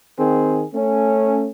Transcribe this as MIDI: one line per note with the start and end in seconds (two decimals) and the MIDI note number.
0.18 0.65 51
0.18 0.65 60
0.18 0.65 68
0.74 1.50 57
0.74 1.50 61